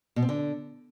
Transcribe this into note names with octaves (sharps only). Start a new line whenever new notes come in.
B2
C4
D3